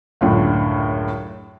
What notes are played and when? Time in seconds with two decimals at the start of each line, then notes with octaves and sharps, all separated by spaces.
0.21 C#2 F#2 A2 D3